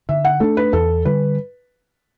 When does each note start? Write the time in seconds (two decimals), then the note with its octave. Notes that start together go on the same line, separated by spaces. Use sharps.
0.09 D3 E5
0.25 F#5
0.40 A3 D4 A4
0.57 B4
0.73 E2 A4
1.05 D3 G3 B4